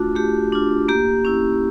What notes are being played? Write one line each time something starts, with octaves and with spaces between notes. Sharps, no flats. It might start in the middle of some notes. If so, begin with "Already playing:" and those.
Already playing: A3 D4 F4 F#4
A3 G4
D4 F4
A#3 G4
C#4 E4